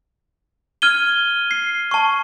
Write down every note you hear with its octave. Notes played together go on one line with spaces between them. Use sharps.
F6 G#6 D#7 G7
C7
A5 C#6